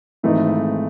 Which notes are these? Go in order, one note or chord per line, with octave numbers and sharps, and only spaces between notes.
G#1 G#2 E3 A3 D#4